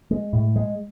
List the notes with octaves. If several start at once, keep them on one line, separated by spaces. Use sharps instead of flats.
G#3
A2
G#3